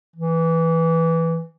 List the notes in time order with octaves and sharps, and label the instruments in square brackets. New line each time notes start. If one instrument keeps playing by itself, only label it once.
[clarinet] E3